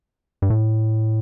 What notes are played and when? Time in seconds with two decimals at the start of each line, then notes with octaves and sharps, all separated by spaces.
0.42 G2
0.50 A2